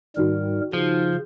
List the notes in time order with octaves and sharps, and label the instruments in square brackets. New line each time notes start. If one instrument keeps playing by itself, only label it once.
[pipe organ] G#2 G3 A#4 [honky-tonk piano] D#3 F#4
[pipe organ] C#3 [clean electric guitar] F3